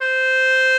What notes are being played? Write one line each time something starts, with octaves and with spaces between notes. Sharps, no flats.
C5